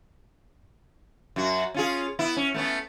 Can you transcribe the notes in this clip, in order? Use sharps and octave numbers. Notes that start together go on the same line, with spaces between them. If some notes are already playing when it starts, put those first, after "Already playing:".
F#2 F#4
C#4 F4 G#4
B3 E4
C#4
A3 B3 C#4